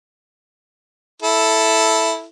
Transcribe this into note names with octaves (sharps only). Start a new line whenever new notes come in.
E4 A4